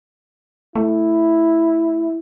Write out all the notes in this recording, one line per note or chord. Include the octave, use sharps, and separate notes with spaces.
A3 E4